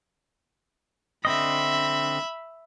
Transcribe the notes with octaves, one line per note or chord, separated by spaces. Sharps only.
D3 C4 D#5 E5 B5